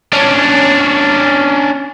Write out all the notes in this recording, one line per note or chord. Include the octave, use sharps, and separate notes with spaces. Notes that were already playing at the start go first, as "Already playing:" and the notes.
C#4 D4